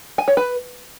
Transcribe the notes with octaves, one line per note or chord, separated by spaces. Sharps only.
G#5
C#5
B4